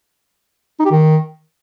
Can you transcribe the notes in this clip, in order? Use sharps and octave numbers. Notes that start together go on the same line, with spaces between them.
D#4
G4
D#3